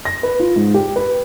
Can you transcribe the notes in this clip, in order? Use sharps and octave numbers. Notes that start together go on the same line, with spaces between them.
A#6
B4
F4
G#2
G4
B4